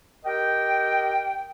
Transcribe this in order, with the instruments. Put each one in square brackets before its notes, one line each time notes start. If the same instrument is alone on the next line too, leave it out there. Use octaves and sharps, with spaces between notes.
[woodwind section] G4 A#4 D#5 G5